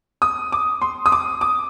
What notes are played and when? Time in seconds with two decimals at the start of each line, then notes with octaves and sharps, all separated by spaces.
0.22 D#6
0.52 D6
0.82 C6
1.06 D#6
1.12 D6
1.41 D6